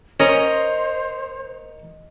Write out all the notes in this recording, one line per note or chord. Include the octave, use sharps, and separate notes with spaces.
C#4 A#4 C5 C#5 D#5